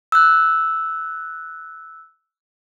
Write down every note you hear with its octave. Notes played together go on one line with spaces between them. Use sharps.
E6 F#6